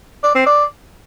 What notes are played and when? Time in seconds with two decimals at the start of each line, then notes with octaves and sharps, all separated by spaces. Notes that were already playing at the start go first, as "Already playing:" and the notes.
0.24 D5
0.35 C4
0.47 D5